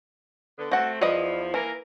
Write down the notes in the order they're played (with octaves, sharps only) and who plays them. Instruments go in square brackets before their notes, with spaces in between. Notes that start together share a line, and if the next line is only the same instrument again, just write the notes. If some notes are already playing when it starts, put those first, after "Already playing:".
[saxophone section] D3 B3
[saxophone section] A3 C4 [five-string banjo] F#4 F#5
[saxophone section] E2 F3 [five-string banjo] B4 D5 D#5
[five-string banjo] E3 [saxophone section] A#3 E4 A#4